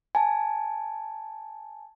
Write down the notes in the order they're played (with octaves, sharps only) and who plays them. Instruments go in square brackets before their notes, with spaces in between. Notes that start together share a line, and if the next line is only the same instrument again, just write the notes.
[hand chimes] G#5 A5